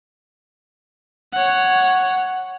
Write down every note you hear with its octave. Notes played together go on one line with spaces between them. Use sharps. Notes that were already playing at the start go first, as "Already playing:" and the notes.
C#5 F#5